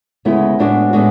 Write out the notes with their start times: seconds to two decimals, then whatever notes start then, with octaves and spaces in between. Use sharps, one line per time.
0.25 D2 C#3 G#3 B3 E4
0.59 A2 G#3 B3 D4 F#4
0.93 A2 G#3 B3 D4 F#4